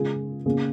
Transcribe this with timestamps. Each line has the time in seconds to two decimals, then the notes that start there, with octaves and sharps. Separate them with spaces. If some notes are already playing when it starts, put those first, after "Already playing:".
Already playing: C#3 G#3 F4 G#4
0.46 C#3 A#3 C#4 G#4